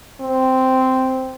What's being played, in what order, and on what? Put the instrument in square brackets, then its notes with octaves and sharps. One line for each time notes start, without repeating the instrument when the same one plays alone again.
[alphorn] C4